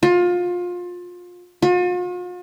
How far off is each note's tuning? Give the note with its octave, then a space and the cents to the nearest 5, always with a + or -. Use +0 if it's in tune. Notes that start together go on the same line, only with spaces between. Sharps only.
F4 +25
F4 +45